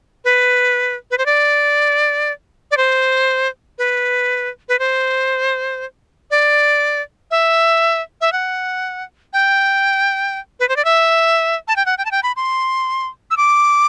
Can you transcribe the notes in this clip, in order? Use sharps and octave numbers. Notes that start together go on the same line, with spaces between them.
B4
B4
C5
D5
D5
C5
B4
B4
C5
D5
E5
E5
F#5
G5
B4
C5
D5
E5
A5
G5
F#5
G5
A5
G5
B5
C6
E6
D6